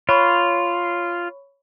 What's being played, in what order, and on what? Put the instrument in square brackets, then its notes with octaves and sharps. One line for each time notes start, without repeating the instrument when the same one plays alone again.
[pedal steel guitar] F4 [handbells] C#5 B5 C#6